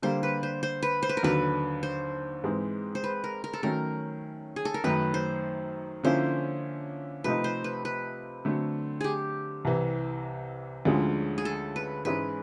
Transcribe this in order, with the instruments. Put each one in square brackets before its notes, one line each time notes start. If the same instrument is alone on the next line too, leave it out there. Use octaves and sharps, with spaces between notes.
[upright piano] D3 G3 A#3 [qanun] C5
[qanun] B4
C5
C5
B4
C5
B4
A#4
[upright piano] D#2 D3 F#3 [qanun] B4
[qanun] C5
[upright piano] G#2 E3 G#3 C4
[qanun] C5
B4
A#4
A#4
A4
[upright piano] D#3 F#3 A3 C#4 [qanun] A#4
[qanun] G#4
A4
A#4
[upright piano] F#2 D#3 F#3 A3 [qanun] B4
[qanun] C5
[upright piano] D3 F3 A#3 C#4 E4 [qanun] C5
[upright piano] C3 F3 A3 C4 D#4 [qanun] B4
[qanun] C5
B4
B4
[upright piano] D3 F#3 A3 C4
[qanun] G4 G#4
[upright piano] C2 C3 E3
D2 D3 F3 G#3 C#4
[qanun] G#4
A4
B4
[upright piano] G#2 E3 G#3 C#4 E4 [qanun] B4